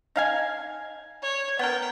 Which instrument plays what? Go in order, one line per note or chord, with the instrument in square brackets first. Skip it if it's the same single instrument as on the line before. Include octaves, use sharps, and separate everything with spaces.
[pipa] D#4 F5 G#5
[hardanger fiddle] C#5
[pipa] B3 A#4 [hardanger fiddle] G5